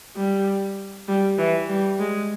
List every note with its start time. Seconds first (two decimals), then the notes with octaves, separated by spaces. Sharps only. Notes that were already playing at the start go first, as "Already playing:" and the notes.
0.16 G3
1.08 G3
1.38 E3
1.69 G3
2.00 G#3